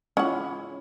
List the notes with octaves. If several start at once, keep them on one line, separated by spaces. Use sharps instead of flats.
G#3 C#4 E4 F4 F#5